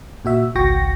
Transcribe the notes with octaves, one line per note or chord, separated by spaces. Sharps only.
A#2 F#4 E5
G#1 C#2 F#4 G5 C#6 A#6